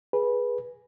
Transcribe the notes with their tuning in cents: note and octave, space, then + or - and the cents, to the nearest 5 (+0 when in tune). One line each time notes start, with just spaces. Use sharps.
G#4 +0 B4 -15